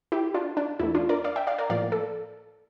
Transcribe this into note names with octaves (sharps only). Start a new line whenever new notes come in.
E4 G4
D4 F4
D4
E2 E3 A3 E4
D4 F4
A#4 D5
D5 F5
E5 G5
D5 F5
A#4 D5
A2 F3 A#3 D5 F5
A4